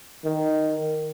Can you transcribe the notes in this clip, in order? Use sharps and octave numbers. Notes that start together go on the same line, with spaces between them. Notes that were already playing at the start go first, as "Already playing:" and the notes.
D#3